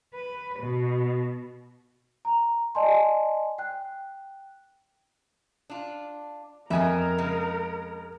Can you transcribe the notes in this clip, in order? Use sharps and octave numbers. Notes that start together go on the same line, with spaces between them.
B4
B2
A#5
D5 D#5 G#5 A5 C6
G5 F#6
D4 F4
F2 B3 A#4 D#5 E5 G#5
C#3 G#3